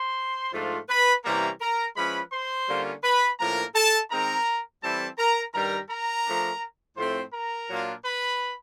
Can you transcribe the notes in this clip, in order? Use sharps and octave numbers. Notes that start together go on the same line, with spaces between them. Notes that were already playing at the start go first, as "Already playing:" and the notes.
Already playing: C5 C6
G#2 F3 A3 D4 F4
B4 B5
C3 E3 G3 A#3 C#4 A#4 A#5
A#4 A#5
F3 G#3 C#4 E4 B4 B5
C5 C6
D3 G3 A#3 C#4 F4
B4 B5
A2 F3 A#3 D4 A#4 A#5
A4 A5
D#3 G#3 C4 D#4 A#4 A#5
E3 G3 C4 E4 A4 A5
A#4 A#5
G2 D#3 G3 A#4 A#5
A#4 A#5
F3 A3 D4
A2 F3 A3 C4 C5 C6
A#4 A#5
A#2 F#3 A#3 D4 F4
B4 B5